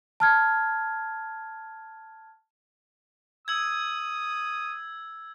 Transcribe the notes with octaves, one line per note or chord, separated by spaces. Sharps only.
A5 F6 G#6
D#6 E6 G#6